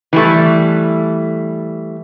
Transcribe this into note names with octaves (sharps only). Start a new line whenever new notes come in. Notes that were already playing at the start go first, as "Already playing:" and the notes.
E3 G3 A3